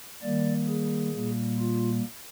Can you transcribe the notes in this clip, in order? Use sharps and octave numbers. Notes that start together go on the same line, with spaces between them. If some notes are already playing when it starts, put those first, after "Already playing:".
D#3 G3 A#3 D5
G#4
A#2 G3 A#3
F4